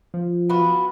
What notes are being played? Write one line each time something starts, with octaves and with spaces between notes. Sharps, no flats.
F3
B3 F4 F#4